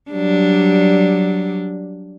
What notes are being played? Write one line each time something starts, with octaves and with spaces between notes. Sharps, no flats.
F#3 G3 D4